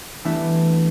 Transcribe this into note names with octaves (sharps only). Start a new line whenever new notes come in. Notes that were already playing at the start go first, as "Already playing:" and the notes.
E3 G3 A3 B3 D4 E4